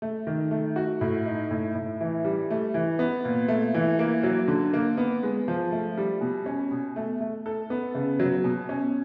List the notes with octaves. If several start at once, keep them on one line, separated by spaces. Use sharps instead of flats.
A3
D#3
A3
F#4
A2
D#4
A2
A2
E3
G3
A3
E3
B3
A#2
A3
E3
A#3
F#3
D3
A#3
B3
G#3
F3
A3
G3
B2
C#4
B2
A3
A3
A4
B3
C#3
F#3
B2
C#4